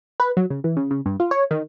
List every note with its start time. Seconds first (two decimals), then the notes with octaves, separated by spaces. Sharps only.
0.20 B4
0.37 F#3
0.50 C#3
0.64 E3
0.77 C#3
0.91 C#3
1.06 G2
1.20 F4
1.31 C#5
1.51 D#3